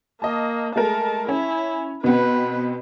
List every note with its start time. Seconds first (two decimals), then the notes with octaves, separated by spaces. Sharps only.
0.22 A#3 D#5 A5
0.76 G#3 A3 A#4 A5
1.29 C#4 E4
2.04 B2 B3 C4 B4